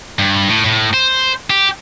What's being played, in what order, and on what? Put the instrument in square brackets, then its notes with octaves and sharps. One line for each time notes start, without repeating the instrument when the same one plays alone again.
[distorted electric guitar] G2
A2
A2
C5
G4